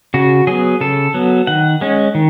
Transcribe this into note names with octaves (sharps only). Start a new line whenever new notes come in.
C#3 F#4
F#3 B3 G#4
C#3 A4
F#3 B3
D#3 F#5
G#3 C#4
D#3